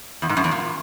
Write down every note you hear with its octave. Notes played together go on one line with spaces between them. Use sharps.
E2
G#2
F#2
E2
A#2